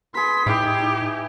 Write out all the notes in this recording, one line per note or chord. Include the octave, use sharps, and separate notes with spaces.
G#4 B4 C6 B6
A2 D#4 E4 G4